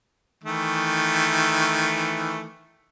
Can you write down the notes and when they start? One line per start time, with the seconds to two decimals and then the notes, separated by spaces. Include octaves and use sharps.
0.44 D#3 E3 A3